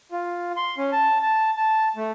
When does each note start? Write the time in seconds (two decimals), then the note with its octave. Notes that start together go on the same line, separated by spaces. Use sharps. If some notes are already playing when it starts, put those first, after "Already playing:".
0.12 F4
0.56 C6
0.78 C#4
0.92 A5
1.23 A5
1.57 A5
1.96 A3